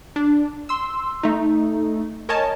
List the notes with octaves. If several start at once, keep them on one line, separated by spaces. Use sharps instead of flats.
D4
C6 E6
A3 D#4
A#4 C#5 D#5 G#5 A5